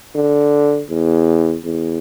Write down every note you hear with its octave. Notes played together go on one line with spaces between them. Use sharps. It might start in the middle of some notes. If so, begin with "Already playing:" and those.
D3
E2
E2